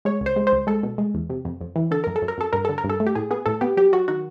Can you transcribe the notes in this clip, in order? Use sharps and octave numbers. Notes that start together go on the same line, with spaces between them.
G#3 C#5
C#2
C5
G#3
C5
C#2
G#3 A4
B2
G#3
E2
C3
F2
F2
E3
D3 A4
F#2 A#4
A4
F#2
A#4
F#2 A4
G2 A#4
D3 A4
A#4
G2
A4
A3
G4
A2 G#4
B3 G#4
A2 A4
B3 G4
F#3 G4
F#3 F#4
D#3 F#4